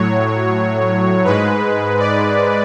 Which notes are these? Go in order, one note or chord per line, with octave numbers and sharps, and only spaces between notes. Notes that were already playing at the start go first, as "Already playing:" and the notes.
Already playing: A2 F#3 C#5
G#2 G#3 B4
D5